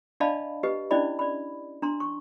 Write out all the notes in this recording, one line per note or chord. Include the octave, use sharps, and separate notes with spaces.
D4 D5 D#5 F5 A5 B5
G4 B4 D#5
C#4 D4 E4 D5 D#5 B5
D5 B5
D4 A#5 C6
C#6